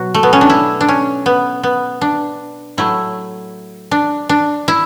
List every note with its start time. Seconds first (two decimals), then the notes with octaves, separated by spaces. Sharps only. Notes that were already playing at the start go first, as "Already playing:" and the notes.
Already playing: B2 F#3 F#4
0.14 A3
0.23 B3
0.33 C#4
0.41 D4
0.50 E4
0.81 D4
0.89 C#4
1.26 B3
1.63 B3
2.01 D4
2.77 A2 F#3 A3 E4
3.91 D4
4.29 D4
4.68 E4